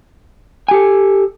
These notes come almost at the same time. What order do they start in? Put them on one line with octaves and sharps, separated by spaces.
G#5 G4 A4